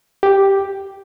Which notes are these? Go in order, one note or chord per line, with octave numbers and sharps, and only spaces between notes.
G4